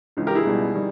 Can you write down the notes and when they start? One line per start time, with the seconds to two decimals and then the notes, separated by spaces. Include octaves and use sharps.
0.17 C#2 C#3 E3
0.27 G4 A#4
0.35 E4 G#4
0.45 C#2 B2 G3
0.74 D#3 G3